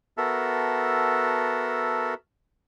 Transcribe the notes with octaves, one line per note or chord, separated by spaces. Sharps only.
B3 F#4 A4 A#4 E5 A5